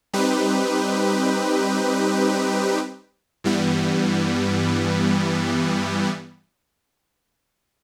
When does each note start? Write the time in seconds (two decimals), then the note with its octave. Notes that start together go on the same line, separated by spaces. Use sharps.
0.13 G3 C4 D#4 G4 B4
3.44 G2 E3 G3 B3